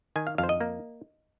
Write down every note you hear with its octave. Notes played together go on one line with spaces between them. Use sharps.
D#3 G#5
F5
F2 F5
C5
D#5
A#3